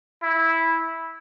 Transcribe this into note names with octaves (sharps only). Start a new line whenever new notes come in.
E4